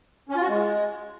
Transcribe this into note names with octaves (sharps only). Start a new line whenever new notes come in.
C#4
F4
F#4
G#3